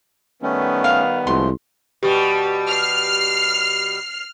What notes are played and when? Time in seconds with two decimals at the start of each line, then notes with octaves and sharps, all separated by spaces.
0.42 D#3 G3 A3 B3 C#4
0.84 F5
1.27 C2 F3 G#3 A3 C6
2.03 B2 G3 G4
2.69 F6 C7